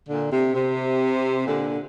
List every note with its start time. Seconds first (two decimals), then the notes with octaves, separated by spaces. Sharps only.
0.08 A#2 D3
0.31 C3
0.54 C3
1.46 A#2 D3